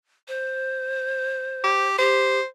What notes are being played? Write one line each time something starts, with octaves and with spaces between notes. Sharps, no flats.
C5
G4
G4 C5